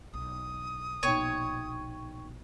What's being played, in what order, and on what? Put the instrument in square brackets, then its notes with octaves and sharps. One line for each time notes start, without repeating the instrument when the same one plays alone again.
[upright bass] B1 [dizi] D#6
[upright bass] A#1 B2 [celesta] D#4 G5 D#7 [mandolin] C#5